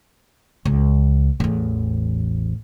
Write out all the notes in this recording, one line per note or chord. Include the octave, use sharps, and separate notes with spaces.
C#2
A1 E2